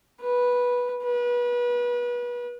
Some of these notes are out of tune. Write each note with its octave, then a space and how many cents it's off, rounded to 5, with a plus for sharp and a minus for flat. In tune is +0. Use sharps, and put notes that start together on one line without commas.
B4 -10
B4 -30